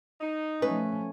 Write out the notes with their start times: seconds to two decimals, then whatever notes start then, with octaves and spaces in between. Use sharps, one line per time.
0.20 D#4
0.62 F3 A3 C#4 B4